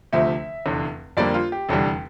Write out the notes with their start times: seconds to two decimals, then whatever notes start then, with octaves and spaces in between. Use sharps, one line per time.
0.13 D2 C3 F3 A3 E5
0.66 F1 E2 D3
1.17 F2 D3 G3 A#3 D5
1.34 F4
1.52 G4
1.69 F1 E2 D3 G3